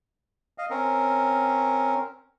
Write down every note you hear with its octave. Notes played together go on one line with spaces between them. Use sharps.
D#5 F5
C4 C#4 A#4